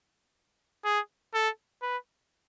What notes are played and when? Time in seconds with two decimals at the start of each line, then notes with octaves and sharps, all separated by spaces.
0.85 G#4
1.34 A4
1.82 B4